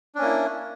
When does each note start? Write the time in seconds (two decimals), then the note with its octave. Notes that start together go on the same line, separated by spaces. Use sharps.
0.15 D4
0.18 C#4
0.22 A#3
0.25 E4